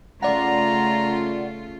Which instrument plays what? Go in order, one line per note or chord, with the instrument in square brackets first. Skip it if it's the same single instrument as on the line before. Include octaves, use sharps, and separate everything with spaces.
[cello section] C#3 A3 F4 [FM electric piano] D5 F#5 [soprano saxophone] A#5